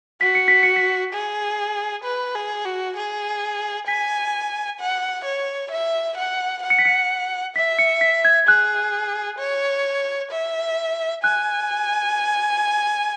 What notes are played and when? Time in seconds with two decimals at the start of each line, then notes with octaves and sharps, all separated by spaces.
0.21 F#4 B6
0.35 C#7
0.48 B6
0.63 C#7
0.76 B6
1.13 G#4
2.04 B4
2.35 G#4
2.65 F#4
2.97 G#4
3.88 G#5 B6
4.80 F#5
5.25 C#5
5.71 E5
6.17 F#5
6.63 F#5
6.70 C#7
6.79 B6
6.85 C#7
7.56 E5 B6
7.79 C#7
8.01 B6
8.25 G#6
8.47 G#4 F#6
9.39 C#5
10.31 E5
11.23 G#5 F#6